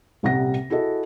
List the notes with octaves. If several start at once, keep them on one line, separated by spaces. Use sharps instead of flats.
D#1 C2 C3 G3 F#5 A#6
E4 F#4 G#4 A4 D#5